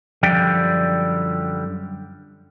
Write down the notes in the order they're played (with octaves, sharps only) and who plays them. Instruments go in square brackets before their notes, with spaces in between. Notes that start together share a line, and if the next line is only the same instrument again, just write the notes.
[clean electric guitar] F#2 D3 F3 G3 G5